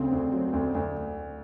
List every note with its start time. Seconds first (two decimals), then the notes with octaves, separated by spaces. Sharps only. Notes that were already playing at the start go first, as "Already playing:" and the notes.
Already playing: D2 C#3 C4
0.12 D2
0.32 F#3
0.53 D2
0.75 D2